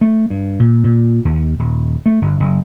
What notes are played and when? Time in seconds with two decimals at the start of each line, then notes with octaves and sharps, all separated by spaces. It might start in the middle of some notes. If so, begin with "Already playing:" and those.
0.01 A3
0.30 G2
0.60 A#2
0.84 A#2
1.25 D#2
1.59 D#1
2.06 A3
2.22 G1
2.40 F#1